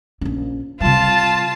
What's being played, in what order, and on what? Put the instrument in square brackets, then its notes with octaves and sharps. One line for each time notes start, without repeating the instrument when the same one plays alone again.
[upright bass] A#1 C#4
[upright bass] C3 G3 [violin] F4 A5